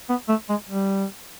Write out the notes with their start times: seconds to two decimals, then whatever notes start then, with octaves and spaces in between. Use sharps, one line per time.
0.09 B3
0.29 A3
0.49 G#3
0.69 G3